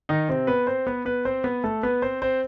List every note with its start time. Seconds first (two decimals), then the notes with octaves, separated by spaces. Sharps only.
0.09 D#3 D#4
0.29 C3 C4
0.47 B3 B4
0.67 C4 C5
0.87 B3 B4
1.05 B3 B4
1.25 C4 C5
1.44 B3 B4
1.64 A3 A4
1.83 B3 B4
2.02 C4 C5
2.22 C4 C5